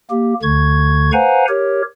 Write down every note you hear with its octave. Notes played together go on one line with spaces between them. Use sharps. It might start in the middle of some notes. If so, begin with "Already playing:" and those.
A#3 G4
D2 D3 C#6 G#6
B4 C5 F5 F#5 G#5 A#5
G4 A#4 C#5